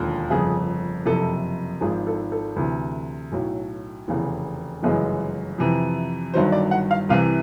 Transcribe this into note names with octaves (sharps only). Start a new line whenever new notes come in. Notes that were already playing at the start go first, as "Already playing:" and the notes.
Already playing: E1 D#2 D3 F3
G1 F2 C#3 G#4
F#1 F2 C3 A4
G#1 G#2 F3 G#4
A4
A4
D2 C3 E3
B1 A2 F#3
F1 E2 C#3
G1 F#2 C#3 E3 G#3
F2 C3 E3
G1 G2 D#3 F#3 C5
D5
F#5
F5
C2 C3 E3 F5